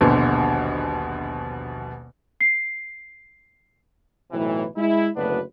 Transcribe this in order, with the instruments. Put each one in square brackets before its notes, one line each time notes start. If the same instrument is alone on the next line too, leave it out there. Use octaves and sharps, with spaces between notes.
[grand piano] D#1 A#1 B2 D3
[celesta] C7
[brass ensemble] B1 A2 C3 E3
G#3 E4
F#1 D2 B3 D4 B4